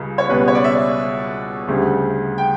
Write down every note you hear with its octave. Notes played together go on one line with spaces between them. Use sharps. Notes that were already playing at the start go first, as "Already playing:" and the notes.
Already playing: C#2 C#3 G3
C#5
C#2 B2 G3 B4
C#5
D5
E5
D2 C#3 G3
G5